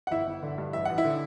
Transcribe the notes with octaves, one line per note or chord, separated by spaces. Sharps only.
F#5
G1 E4 E5
G1
D3
G2
A1 E5
A1 F#5
E4 E5
D3